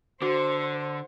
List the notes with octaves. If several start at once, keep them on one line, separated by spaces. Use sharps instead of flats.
D3 F#4 C5